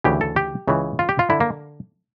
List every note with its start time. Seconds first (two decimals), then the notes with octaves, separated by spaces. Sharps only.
0.04 D2 C#3 E3 G4
0.21 A4
0.36 G4
0.68 C#2 C#3 E3
0.99 F4
1.09 G4
1.19 F4
1.30 D3 E4
1.40 A#3